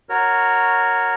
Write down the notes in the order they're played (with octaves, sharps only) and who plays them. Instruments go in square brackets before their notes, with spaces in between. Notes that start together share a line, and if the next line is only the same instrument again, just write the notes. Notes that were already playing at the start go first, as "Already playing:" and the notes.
[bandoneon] F#4 A#4 C#5